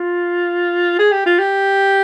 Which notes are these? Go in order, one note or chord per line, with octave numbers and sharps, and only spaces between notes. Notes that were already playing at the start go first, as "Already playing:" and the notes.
Already playing: F4
G#4
G4
F4
G4